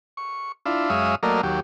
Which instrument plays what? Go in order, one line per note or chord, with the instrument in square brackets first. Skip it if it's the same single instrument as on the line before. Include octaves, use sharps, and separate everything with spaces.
[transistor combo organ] C#6
D4 E4 F4
F#2 G#3 C#5 E5 F5 D#6
F#3 A3 A#3 A#4 D5 D#5
D#2 F#3 G4